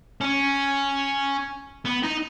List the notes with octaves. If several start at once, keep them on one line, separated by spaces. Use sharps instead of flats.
C#4
B3
D#4